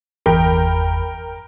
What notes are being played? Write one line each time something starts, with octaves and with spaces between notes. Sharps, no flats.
G1 E2 A#4 G5 B5